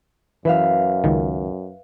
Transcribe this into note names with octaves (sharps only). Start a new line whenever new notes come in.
F#2 E3 B4 E5 F5
C#2 D#3